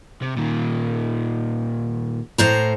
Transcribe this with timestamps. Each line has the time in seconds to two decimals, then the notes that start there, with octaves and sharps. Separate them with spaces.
0.22 C3
0.37 A#2 D#3
2.38 A2 C5 A#5